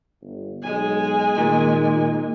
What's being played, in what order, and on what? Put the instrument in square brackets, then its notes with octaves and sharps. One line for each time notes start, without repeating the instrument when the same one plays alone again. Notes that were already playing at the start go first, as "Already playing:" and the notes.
[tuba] G1
[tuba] B1 [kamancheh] G#3 G#5
[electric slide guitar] A#2 [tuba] D#3